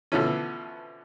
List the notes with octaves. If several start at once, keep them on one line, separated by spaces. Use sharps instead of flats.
B2 D3 E3 F3 A3 C#4